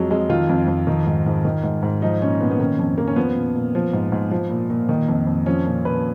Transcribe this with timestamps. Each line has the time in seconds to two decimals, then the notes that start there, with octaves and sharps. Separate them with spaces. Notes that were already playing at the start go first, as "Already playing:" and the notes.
Already playing: F2 F3 F#3 G#3
0.11 F2 G#3
0.29 D#3 F4
0.49 F2
0.68 F2
0.87 D#3
1.06 G#2
1.26 G#2
1.45 D#3
1.63 G#2
1.83 G#2
2.02 F3 D#4
2.21 A#2 C#4
2.41 A#2 B3
2.51 B3
2.59 D#3 C#4
2.79 F2
2.98 F2 A#3
3.07 C#4
3.16 F3 B3
3.36 A#2
3.55 A#2
3.75 F3
3.93 G#2
4.12 G#2
4.31 F3
4.51 A#2
4.70 A#2
4.89 D#3
5.08 F2
5.27 F2
5.46 F3 C#4
5.66 A#2 C#4
5.85 A#2 B4